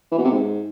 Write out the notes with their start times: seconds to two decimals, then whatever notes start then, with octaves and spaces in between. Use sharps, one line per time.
0.12 E3
0.18 B2
0.25 C3
0.31 G#2